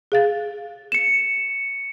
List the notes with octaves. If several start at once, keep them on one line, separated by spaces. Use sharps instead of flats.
G#4 F5 A6
C#7 E7